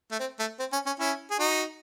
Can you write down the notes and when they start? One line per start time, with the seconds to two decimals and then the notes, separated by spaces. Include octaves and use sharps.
0.11 A3
0.19 C4
0.39 A3
0.59 C4
0.73 C#4
0.86 C#4
0.99 C#4 E4
1.31 G#4
1.39 D#4 F#4